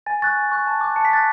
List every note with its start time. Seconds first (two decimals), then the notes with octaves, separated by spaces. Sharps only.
0.06 G#5 A6
0.22 C#6 F#6 A6
0.37 G#5
0.52 C#6 F#6
0.67 A5
0.81 D6 F#6
0.96 A5 C#7
1.05 B6
1.11 D6 F#6 A6